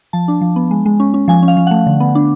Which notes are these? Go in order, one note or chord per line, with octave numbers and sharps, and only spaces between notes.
F3 A5
D4
F3
B3
G#3
G#3
C#4
C#4
F3 G#5
C#4
F5
F3
A3 F#5
D3
B3
D4